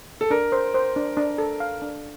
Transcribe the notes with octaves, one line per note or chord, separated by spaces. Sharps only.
A4
D4 A#4
C5
C5
D4
D4
A4
F5
D4